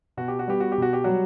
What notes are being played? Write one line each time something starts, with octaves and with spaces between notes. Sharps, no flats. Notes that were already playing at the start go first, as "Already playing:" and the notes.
B2 F#4
G4
F#4
G3 B3 G4
F#4
G4
B2 F#4
G4
F#3 G3 F#4